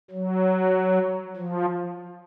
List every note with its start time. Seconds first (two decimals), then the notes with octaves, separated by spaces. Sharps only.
0.11 F#3
1.36 F3